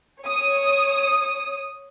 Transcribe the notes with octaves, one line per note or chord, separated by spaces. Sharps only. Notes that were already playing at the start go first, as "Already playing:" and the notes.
C#5 D#6